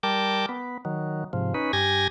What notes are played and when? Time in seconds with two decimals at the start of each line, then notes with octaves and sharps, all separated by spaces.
0.03 G3 A#4 G5 A5 D6
0.49 B3
0.85 D#3 F#3
1.33 G#2 C3 F3
1.54 C#4 D#4 B4
1.73 G2 G4 G#5 G#6 A#6